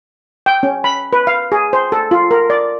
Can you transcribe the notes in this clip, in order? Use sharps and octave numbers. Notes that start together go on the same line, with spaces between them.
G5
C#4
B5
B4
F5
G#4
C5
A4
F4
A#4
D5